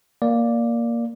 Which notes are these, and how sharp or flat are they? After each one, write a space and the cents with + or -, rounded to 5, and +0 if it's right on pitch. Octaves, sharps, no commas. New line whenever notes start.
A#3 +0 D5 +0